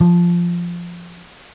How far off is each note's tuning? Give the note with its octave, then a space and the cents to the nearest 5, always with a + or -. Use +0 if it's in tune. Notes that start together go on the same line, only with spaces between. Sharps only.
F3 -5